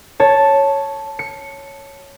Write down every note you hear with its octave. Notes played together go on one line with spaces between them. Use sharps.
C#5 A5
C#7